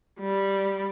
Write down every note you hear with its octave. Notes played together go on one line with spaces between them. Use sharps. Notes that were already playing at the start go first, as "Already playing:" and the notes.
G3